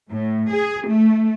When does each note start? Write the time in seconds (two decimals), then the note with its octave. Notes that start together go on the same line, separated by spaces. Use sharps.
0.11 A2
0.53 G#4
0.88 A3